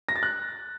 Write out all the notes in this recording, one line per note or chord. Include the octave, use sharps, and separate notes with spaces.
A#6
A6
F#6